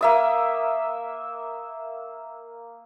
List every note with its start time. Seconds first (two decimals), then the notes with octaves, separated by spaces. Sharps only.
0.01 A#3 E5 D#6